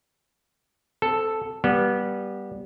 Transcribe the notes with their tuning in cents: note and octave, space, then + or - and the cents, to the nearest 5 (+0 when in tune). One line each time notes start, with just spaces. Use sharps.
C4 -25 A4 +0
G3 +0 B3 -20